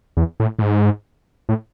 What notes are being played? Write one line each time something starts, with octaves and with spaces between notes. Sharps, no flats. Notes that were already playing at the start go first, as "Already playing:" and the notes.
E2
A2
A2
G#2
A2